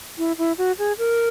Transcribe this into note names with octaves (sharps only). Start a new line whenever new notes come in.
E4
E4
F#4
G#4
A#4